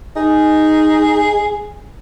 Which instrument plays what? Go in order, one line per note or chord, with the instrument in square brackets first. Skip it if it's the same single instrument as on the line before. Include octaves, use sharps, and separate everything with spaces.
[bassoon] D#4 [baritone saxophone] G#4